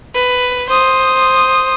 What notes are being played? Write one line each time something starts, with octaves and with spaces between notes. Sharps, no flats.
B4
C5 D#6